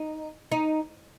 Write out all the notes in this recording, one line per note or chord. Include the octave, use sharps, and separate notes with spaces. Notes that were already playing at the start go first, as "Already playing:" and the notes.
Already playing: D#4
D#4